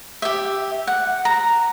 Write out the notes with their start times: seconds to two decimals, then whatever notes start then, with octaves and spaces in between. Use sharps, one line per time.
0.22 G4 E5
0.87 F#5
1.25 A#5